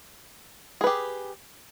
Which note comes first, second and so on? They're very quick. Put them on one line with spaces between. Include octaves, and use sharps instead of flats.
G#4 B4 G4